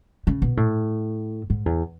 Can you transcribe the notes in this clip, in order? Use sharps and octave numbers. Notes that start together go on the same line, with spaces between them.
C#3
B2
A2
G#2
E2